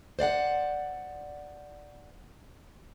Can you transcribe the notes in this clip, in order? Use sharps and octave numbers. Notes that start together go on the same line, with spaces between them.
C5 D5 F5 F#5